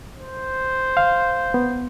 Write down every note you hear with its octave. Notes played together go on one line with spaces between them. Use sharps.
C5
F5
B3